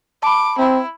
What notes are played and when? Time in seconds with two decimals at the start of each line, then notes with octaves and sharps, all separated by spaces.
0.23 A5 B5 D6
0.58 C4 E4